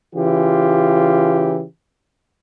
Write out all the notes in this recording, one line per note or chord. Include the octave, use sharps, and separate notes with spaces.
C#3 E3 F4 G4